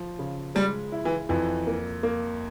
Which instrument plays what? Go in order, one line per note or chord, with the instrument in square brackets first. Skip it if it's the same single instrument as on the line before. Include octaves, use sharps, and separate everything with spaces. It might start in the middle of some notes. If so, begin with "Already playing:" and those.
Already playing: [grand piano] F3
C#3
[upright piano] G3 [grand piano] G#3
[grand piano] E4
[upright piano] E3
[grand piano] F2 [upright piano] E3
[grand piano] A#3
A#3